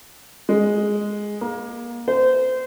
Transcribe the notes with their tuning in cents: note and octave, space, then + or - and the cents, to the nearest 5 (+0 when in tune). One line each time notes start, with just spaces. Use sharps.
G#3 +0
A#3 +25
C5 -25